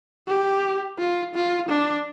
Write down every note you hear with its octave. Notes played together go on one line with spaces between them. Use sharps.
G4
F4
F4
D4